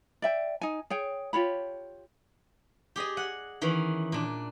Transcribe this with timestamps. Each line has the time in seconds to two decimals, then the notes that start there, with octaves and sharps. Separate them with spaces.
0.22 D5 E5 G5
0.61 D#4 G#5
0.90 G#4 C#5 G5
1.33 F4 G4 C#5 B5
2.96 G4 G#4 D5 D#5
3.17 F#5 G#5
3.62 D#3 E3 C#4
4.12 A#2 D4